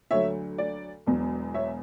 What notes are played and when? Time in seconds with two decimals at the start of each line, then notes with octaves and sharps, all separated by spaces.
0.11 D2 D3 F#3 C#5 E5
0.58 D5
1.07 E1 E2 B2 F#3
1.54 C#5 E5